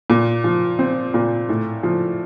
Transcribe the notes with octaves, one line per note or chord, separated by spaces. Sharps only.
A#2
F3
C4
A#2
A2
F3